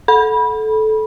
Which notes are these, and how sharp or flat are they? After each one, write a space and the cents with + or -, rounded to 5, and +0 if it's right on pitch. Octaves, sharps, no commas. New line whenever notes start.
A4 -15 B5 -20